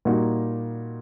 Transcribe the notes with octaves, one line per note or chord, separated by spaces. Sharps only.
A#2 G3 A#3 D#4 F#4